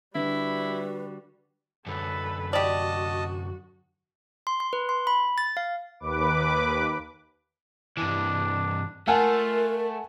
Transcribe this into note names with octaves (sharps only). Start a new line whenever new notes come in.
D3 G3 E4 F#4 B4
F#2 D3 A4 B4
F#4 G4 D5 D#5 A5
C6
C6
B4
C6
B5
A6
F5
D#2 B4 D6
G2 E3 D4
A3 F4 A#4 F#5 G#5 A5